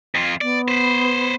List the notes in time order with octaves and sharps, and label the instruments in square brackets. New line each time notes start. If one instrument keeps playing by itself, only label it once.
[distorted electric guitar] F2 F4
[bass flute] B3 [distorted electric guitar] D5
[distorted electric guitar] B4 C5